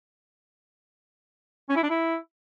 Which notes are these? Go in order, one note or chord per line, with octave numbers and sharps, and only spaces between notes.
C#4
E4
D4
E4